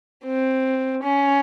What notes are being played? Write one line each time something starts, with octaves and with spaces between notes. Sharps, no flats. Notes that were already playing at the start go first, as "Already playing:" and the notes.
C4
C#4